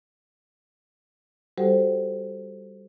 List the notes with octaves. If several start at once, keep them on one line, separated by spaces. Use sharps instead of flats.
G3 F#4 G4 A4 C5 F#5